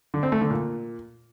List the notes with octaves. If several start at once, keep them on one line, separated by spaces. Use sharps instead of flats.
D3
C4
A3
D3
A#2